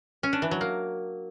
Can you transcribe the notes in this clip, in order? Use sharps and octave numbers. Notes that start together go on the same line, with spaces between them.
C#4
D4
E3
F#3
A#3